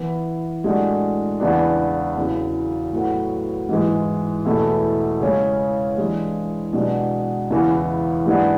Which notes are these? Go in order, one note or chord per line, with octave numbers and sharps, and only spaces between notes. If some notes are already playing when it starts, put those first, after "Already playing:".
Already playing: E3 B3 E4
A2 G#3 D4 F#4
E2 C#3 E3 B3 D4
E2 C#3 F#3
A2 F#3 B3
G#2 E3 G#3
E2 B2 A3 E4
C#3 G#3 C#4
E3 G#3 D4
B2 G#3 D4 F#4
E2 C#3 E3 B3
G#2 E3 G#3 B3 D4